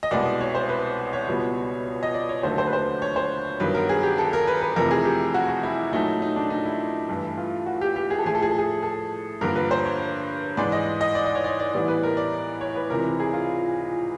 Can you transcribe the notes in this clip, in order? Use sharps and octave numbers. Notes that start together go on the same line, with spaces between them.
D#5
C2 B2 G#3 B3 D5
C#5
C5
B4
C#5
C#2 B2 G3 B3
D#5
D5
C#5
D#2 D3 F#3 A3 C5
C5
B4
C5
C#5
C5
G2 D#3 F#3 B3 B4
A#4
G#4
G4
A4
A#4
B4
B4
F2 C3 E3 A3 A#4
G#4
G4
F#4
F#4
E4
A#2 F#3 A3 D#4
D#4
D4
D#4
E4
G2 E3 A3
F4
F#4
G4
G4
G#4
A4
A2 F3 A3 G#4
A4
G#4
A4
G#4
A4
G2 D3 F3 A#3 A#4
B4
C5
C#5
G#2 E3 G#3 D5
D#5
D#5
D5
D5
C#5
D5
D5
A2 E3 G3 B3 D5
B4
A#4
D5
C#5
B4
C#2 C3 E3 A#4
G#4
F4